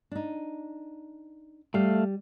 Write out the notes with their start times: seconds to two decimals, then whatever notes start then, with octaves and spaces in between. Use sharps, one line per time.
0.11 D4 D#4
1.74 G3 A3 F5